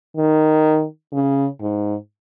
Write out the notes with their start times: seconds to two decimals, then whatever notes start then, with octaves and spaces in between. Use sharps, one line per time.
0.17 D#3
1.13 C#3
1.61 G#2